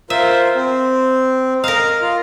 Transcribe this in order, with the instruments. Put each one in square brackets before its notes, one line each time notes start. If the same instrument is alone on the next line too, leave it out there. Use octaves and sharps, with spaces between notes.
[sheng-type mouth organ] F4 A#4 C5 [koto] E5
[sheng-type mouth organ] C4
[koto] A#4 F5 [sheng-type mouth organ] D#5 A#5 F6
[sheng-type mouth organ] F4